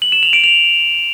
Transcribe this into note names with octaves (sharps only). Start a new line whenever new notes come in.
F#7
E7
F7
D7
F7